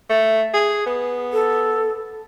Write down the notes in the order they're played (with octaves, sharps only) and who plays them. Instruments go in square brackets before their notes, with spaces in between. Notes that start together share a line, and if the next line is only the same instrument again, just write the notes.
[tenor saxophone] A3
G#4
B3
[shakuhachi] A4